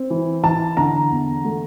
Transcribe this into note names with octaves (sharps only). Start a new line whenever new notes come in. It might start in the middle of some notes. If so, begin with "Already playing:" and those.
Already playing: C4
E3
E3 A5
D3 A#5
E2
A3